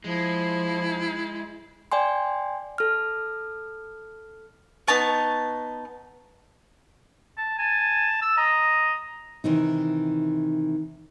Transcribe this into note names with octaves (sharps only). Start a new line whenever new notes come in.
F3 G#3 E4
D5 G5 G#5 C6
A4 F6
B3 D#4 A5 C#6
A5
G#5 A5
E6
D#5 A#5
C3 D#3 E3 D#4